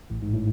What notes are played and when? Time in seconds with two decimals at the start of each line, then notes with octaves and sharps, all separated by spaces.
0.10 A1 A2
0.22 G#2
0.34 A2